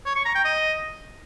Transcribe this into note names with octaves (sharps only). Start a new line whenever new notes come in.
C#5
C#6
A#5
G5
D#5